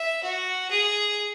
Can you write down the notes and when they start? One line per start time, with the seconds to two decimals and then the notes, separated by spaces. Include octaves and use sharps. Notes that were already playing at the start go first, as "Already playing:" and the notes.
Already playing: E5
0.23 F#4
0.71 G#4